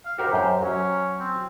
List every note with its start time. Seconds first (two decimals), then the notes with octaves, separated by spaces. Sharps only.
0.05 F5
0.18 F#4 G4 A#4 C5
0.33 F#2 C5
0.63 F#3 C#4
1.19 C4